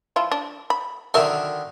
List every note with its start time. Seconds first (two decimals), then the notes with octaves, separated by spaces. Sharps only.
0.16 F3 E4 F4
0.31 D4
0.70 B5
1.14 D3 D#3 F#3 A#4 E5 C6